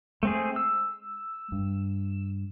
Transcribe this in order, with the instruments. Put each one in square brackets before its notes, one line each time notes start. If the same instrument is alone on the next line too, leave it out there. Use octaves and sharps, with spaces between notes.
[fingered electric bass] G#3 [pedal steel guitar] A3 C4 G#4
[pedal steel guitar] E6
[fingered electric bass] G2